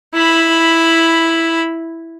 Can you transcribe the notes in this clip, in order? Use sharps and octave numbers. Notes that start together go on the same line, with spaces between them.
E4 B5